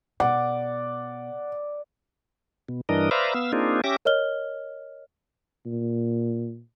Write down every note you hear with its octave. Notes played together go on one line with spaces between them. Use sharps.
B2 D5 F#5
B2
G2 E3 D4 A#4 D#5
B4 C5 D5 E5 F5 A#5
B3 F5 E6
A#3 C4 D4 D#4 F4 G#4
C#4 G4 E5 D6 A#6
A#4 C#5 D#5 F6 G7
A#2